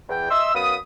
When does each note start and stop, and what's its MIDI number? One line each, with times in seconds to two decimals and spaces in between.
0.09 0.27 40
0.09 0.27 79
0.30 0.52 75
0.30 0.52 76
0.30 0.52 84
0.30 0.52 88
0.54 0.76 42
0.54 0.76 59
0.54 0.76 77
0.54 0.76 83
0.54 0.76 87